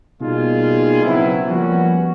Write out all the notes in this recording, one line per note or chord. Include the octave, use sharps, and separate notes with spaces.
B2 G3 A#3 D#4 F4 G#4
C#3 F#3 B3 C4 E4
F3 G3 A#3 B3 C#4 F#4